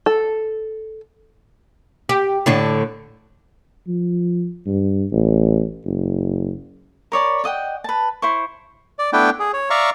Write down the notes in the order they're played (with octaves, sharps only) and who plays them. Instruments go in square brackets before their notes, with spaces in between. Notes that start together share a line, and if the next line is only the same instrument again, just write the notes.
[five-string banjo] A4
[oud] G4
A2 D3 D4
[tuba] F3
G2
A1
F#1
[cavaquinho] A#4 C#5 D5 B5
D5 D#5 F#5 G5
B4 A5
E4 C5 C#6
[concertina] D5
A3 B3 D4 E4 B4 G5
G#4
C#5
D5 E5 F5 A#5 C#6